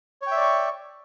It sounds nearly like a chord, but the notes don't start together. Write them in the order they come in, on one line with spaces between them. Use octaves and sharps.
C#5 G5 E5 D5 C#6